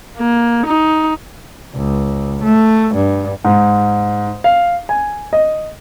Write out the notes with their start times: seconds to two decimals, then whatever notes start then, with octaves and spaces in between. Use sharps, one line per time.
0.17 A#3
0.66 D#4
1.75 C#2
2.43 A3
2.94 G2
3.44 G#2
4.44 F5
4.89 G#5
5.33 D#5